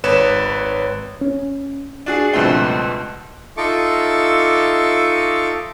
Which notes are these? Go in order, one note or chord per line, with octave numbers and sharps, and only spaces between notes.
G#1 B4 C#5 E7
C#4
D4 F#4 G#4
C#2 G2 B2 F3 A3 C4
D#4 F4 A4 E5 C#6 D6